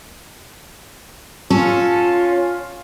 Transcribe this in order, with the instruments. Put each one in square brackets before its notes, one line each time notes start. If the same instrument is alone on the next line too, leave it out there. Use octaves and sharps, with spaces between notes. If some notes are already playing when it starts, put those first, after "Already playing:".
[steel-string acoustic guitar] C#4 A4 [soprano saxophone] F4